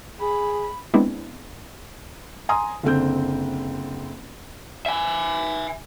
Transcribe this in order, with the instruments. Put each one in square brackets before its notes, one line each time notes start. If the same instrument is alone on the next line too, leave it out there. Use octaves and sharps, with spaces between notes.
[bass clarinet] G#4 [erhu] B5
[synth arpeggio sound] G#3 B3 C4 D4 E4
[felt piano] G#5 A#5 C6 D#6
F#1 D3 C4 G6
[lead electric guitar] E5 G#5